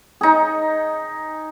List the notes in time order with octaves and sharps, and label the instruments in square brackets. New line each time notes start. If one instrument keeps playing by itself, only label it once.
[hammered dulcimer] D#4 G#4